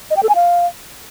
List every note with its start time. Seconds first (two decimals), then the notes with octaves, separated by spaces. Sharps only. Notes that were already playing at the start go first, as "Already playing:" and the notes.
0.11 D#5
0.17 G5
0.23 A4
0.29 G#5
0.35 F5